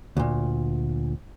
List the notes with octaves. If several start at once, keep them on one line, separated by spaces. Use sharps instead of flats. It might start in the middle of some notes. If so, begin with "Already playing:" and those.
D2 A#2